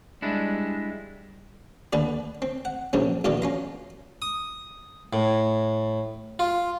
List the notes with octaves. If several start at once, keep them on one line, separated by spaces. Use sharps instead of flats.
G3 G#3 D4 E4
D#2 D3 B4 D5
C4
F#5
A#1 F#2 C3 C#4
A#1 B2 D#3 E3 B3 D5
C#4 F4 A#5
D#6
A2
F4